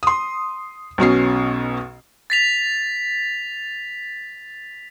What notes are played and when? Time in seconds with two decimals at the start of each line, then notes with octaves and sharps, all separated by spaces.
0.03 C6 D#6
0.98 B1 B2 C#4 C7
2.30 A6 B6 F7